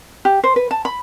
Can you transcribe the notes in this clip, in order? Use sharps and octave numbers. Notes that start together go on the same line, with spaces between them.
G4
C5
B4
A5
B5